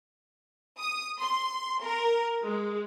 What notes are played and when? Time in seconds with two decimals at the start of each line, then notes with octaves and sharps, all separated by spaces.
0.78 D#6
1.19 C6
1.82 A#4
2.43 G#3